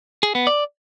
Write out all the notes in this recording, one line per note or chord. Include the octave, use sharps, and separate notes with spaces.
G#4
B3
D5